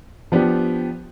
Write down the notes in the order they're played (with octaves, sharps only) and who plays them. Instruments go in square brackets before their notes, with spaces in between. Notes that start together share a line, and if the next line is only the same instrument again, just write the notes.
[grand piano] F3 B3 D4 G4